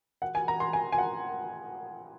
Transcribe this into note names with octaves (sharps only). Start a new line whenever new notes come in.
F#5
G#5
A#5
C6
G#5
G#5
F#5